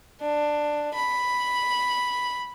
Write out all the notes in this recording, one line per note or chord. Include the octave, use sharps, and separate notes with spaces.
D4
B5